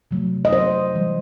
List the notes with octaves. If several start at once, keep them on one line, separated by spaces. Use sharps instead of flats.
C3 F#3 A3
D#5
C5
C3 E3 G3